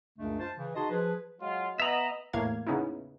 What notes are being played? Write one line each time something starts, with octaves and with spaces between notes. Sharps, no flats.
C#2 F#2 C#3 G#3 A3 D4
F4 C5 A5
C#3 E3
D#4 F#4 G#4 D#5 A5 C6
F3 G#4 B4
F#3 G#3 F4
B3 D#5 E5 A#5 B5
E2 A2 A3 A#3 F5 G#6
C#3 B3 C#4 D#4 E4